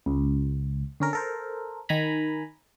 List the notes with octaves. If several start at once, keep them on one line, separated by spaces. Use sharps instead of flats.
C#2
D3 C#4 A#4
A4 A#4 C5
D#3 G#5 A#5 B5